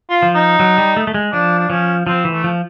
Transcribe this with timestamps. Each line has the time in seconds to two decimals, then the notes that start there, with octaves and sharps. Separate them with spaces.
0.10 F4
0.23 F3
0.35 D#4
0.60 F#3
0.78 G3
0.97 A3
1.07 A3
1.14 G#3
1.33 F3 D4
1.59 D4
1.70 F3 C#4
2.07 F3 C4
2.25 E3
2.31 A3
2.44 F3